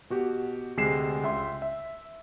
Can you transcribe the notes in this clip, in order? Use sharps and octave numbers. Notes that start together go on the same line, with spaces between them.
B2 F#4 G4
D2 C3 G#3 C7 E7
C#2 E5 C6
E5